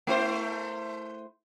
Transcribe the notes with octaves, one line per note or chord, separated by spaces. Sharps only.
A3 E4 C5